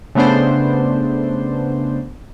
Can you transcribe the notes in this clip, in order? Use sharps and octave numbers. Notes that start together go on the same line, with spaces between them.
C#3 A3 B3 D4 C5